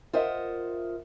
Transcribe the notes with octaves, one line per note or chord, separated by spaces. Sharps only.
F4 A#4 C5 D#5 E5 F#5